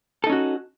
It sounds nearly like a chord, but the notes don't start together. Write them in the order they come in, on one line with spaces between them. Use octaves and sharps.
A4 D#4 C#4 F#4